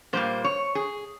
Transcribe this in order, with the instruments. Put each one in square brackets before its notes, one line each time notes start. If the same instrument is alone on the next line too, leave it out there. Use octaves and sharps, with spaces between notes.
[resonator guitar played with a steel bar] A#2 G3 A#3 C5
C#5
G#4